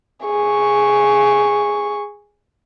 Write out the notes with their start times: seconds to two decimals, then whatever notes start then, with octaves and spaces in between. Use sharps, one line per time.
0.25 G#4 C#6